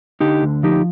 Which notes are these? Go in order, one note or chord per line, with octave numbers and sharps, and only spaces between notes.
D3 D#4 G4
D2
F3 D#4 G4